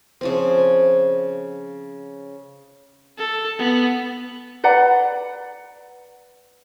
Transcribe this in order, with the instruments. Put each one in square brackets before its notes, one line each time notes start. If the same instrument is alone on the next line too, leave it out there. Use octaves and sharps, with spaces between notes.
[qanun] C#3 F3 C4
[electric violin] A4
B3
[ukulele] B4 D5 F#5 A#5